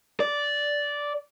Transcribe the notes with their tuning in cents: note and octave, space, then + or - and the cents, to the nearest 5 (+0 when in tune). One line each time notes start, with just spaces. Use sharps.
D5 -10